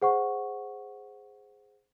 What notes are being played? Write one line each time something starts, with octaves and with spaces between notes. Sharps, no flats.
G#4 C5 F#5 C#6